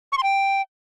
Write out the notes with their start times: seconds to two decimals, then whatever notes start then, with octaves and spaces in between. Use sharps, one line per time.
0.12 C#6
0.18 C6
0.23 G5